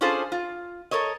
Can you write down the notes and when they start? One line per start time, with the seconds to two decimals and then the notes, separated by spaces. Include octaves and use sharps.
0.01 C#4 D4 F4 G#4 A4 C5
0.32 F4
0.91 A4 A#4 C#5 D#5